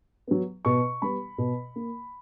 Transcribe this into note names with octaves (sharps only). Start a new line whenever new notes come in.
F#3 B3
B2 C#6
G3 B3 B5
B2
A#3